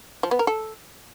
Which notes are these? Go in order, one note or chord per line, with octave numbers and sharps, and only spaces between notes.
F3
B3
A#4
A4